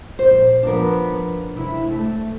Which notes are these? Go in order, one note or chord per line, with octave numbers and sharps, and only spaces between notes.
A#1 C5
F3 B3 D4 A#4
C3 E4
A3